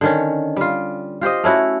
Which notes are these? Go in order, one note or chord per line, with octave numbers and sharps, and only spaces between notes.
D3 D#3 C#4
G3 F4
F4 G4 C5 D#5
A3 C#4 E4 F#4